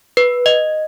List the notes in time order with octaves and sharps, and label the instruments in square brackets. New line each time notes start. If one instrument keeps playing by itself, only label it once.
[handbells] B4
D#5